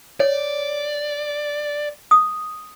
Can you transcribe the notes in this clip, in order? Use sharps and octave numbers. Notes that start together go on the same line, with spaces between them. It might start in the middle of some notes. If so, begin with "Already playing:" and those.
C#5 D5
D#6